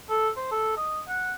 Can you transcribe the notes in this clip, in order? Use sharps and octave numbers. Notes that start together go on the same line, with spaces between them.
A4
C5
A4
D#5
F#5